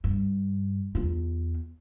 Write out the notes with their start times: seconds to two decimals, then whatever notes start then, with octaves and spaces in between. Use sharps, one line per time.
0.04 G2
0.95 E2 F4